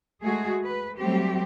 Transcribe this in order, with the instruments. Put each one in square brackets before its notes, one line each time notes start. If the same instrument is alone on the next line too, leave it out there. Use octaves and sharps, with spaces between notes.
[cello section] G#3 A3 F#4 G#4
B4
F#3 G3 A3 C4 G4